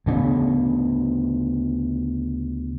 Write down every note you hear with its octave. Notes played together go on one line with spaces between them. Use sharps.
D2 C#3 A3 B3